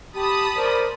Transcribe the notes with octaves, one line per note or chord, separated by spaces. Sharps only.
G4 A5 B5 D#6
A#4 C5 D5